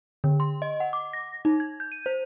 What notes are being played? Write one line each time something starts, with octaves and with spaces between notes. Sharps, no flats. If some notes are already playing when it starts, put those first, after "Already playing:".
D3
C6
D#5
F#5
D6
A#6
D#4
G#6
G6
D#7
C5